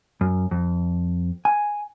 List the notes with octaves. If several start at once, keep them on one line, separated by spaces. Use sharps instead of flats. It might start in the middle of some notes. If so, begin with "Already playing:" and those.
F#2
F2
G#5